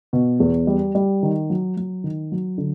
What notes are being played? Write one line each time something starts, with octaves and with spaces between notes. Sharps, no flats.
B2
E2
G3
G3
D#3
F#3
F#3
D#3
F#3
D3